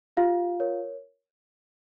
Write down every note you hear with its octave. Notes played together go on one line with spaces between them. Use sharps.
F4 G4 F5
A#4 C#5